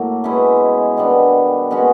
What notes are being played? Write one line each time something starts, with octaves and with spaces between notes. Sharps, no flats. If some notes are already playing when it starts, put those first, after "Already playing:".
Already playing: A2 F#3 A#3
B2 G#3 C#4 E4
D#3 G3 B3 D4
B2 G#3 C#4 F#4